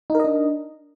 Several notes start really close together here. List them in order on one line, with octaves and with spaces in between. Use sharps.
D#4 A#4 D#5 D4